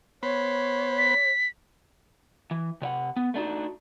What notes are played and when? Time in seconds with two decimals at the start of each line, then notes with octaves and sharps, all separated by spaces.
0.23 B3 C5 C#5 B5
0.98 B6
2.51 E3
2.82 C3 C#5 F#5
3.16 B3
3.34 A3 D4 D#4 F#4